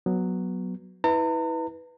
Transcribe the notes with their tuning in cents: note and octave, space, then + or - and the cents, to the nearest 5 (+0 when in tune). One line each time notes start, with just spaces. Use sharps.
F#3 +0 B3 +0
E4 -30 B4 +0 A#5 -45